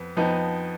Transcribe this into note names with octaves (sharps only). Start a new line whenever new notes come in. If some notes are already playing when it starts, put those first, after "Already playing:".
Already playing: F2 B3
F2 F3 B3 D#4